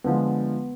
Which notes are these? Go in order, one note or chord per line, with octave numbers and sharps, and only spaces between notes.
D3 F3 G#3 B3